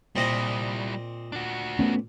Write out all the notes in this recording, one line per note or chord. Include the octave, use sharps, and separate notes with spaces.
A#2 G3 C4 E4 D#5
D4 F#4
A3 B3 C#4